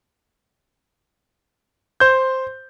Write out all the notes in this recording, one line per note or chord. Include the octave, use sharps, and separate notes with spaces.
C5 G6